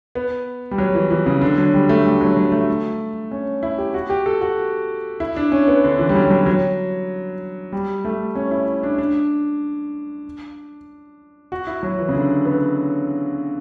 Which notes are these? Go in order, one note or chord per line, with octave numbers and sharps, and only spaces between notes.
B3
G3
F#3
E3
E3
C#3
D3
F#3
G3
A3
G3
F#3
F#3
A3
C#4
E4
G4
F#4
G4
A4
F#4
E4
D4
C#4
B3
D3
E3
G3
F#3
G3
F#3
F#3
G3
A3
C#4
E4
D4
D4
F#4
E4
F#3
E3
C#3
D3
B3